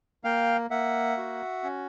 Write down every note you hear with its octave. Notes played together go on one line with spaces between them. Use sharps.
A#3 F5 G5
A#3 E5 F#5
F#4
C#4